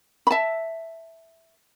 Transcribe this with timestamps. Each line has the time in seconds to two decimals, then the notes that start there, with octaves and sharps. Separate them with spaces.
0.27 B5
0.31 E5 A5